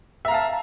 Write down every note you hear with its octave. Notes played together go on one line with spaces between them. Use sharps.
E5 F5 A5 A#5